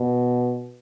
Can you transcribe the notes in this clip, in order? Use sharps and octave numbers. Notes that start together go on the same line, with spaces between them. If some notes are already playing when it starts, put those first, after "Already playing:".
Already playing: B2